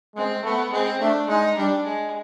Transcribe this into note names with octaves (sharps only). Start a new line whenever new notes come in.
G#3 C4
A3 B3
G#3 C4
A3 D4
G#3 D#4
G3 D4
G#3